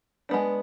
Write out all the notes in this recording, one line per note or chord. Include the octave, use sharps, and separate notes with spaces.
G#3 B3 D4